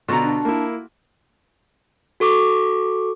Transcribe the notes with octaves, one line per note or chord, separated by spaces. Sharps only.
B2 D3 F4 F#4 A4 C5 A#5
D4
A#3 E4
F#4 A4 C#6 D6